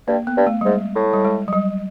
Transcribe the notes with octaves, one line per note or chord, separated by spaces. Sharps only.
G2 A#3
B3
G2
A3
G3
G#2 G#3
A2
G3
G#3
F#3
G3